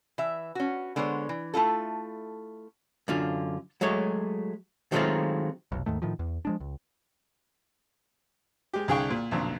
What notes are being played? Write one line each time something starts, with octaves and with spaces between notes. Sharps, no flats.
E3 E5
C#4 F#4
D3 G#3 B3 C5 C#5
E3
A3 E4 F4 A4
F#2 D3 F4
F#3 G#3 A3 C#5
D#3 F#3 G#3 A3 C4 F4
F1 B1
D#2 G#2 D#3 A3
A2 D#3 F3
E2
F3 G#3 D4
C#2
G#3 G4
C2 D3 G#4 F5 G5 C#6
A#2
B1 F2 A#2 D3